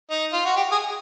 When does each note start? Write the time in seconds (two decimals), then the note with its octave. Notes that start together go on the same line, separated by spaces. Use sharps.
0.10 D#4
0.33 F4
0.45 F#4
0.56 G4
0.72 G#4